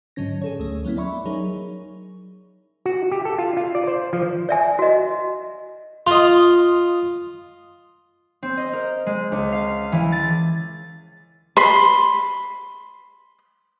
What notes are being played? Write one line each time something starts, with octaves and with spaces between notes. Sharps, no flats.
G#2 D3 F#3 C#4 A#6
G#4 A4 C#5
D2 A3
F#3 A#3 B3 C#4 E4
D5 E5 B5 C#6
F#3 D#4 G#4 A#4 C#5
F#4
G4
A4
F4
F4
D5
C5
F3
D5 E5 G#5
F#4 D#5
F4 D#5 C6
C4
D#5
A#4
G#3
C#2
F5
E3
A6
B5 C6